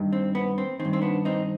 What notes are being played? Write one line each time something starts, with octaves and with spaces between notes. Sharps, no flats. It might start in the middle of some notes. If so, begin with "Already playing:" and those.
Already playing: G2 D#3
C4
B3
C4
D#3 C4
G2
C4
B3 D4
C4 D#4